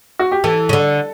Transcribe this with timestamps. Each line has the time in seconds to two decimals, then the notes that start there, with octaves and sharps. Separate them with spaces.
0.19 F#4
0.31 G4
0.44 E3 A4
0.69 C#3
0.73 D3